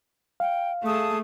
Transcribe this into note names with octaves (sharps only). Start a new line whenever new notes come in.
F5 G5
A3 G#4 A5 D#6